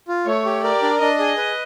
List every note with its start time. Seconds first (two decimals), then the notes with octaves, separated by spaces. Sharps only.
0.08 F4
0.26 A3 C#5
0.45 G4
0.64 A#4 D5
0.82 D4
1.00 D4 D#5
1.19 G#4
1.37 B4